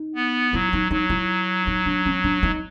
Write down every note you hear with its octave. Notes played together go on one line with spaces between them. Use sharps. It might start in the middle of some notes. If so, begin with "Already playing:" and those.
Already playing: D#4
B3
F#3 E4
D#4
F#3 D#4
E4
D#4
D4
C#4
D4
D#4